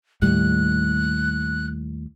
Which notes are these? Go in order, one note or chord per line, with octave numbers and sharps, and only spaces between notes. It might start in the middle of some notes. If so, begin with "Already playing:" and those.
D#2 A2 G3 F#6